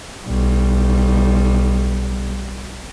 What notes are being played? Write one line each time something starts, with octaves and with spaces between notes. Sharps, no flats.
B1 G3